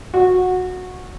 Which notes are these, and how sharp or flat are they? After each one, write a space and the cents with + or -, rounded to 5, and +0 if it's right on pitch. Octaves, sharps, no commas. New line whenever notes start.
F#4 -15